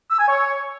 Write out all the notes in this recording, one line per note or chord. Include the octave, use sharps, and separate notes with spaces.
E6
G#5
C#5